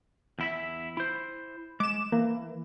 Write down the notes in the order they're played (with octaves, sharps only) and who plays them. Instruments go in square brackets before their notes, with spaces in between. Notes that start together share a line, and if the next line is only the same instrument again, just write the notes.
[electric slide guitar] E2 E4 E5
E4 C5
[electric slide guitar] G#3 [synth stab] D6 E7
[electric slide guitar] E3 [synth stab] A#3